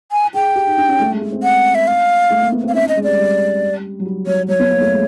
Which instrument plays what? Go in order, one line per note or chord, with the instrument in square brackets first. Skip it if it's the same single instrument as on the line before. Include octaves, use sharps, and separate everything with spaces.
[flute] G#5
[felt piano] G#4 [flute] G5
[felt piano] G4
D#4
D4
C#4
A3
G#3
A3
C4
[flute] F#5
E5
F5
[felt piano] A3
A#3
B3
C4
[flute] F5
[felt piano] C#4 [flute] E5
[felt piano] C#4
[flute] D#5
[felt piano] G#3
[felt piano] G3 [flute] D5
[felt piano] G3
F#3
G3
[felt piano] F#3 [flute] C#5
[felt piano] F#3 [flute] C#5
[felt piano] B3
A#3
A3
G#3